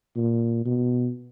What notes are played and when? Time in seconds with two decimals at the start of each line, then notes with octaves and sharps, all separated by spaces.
0.17 A#2
0.65 B2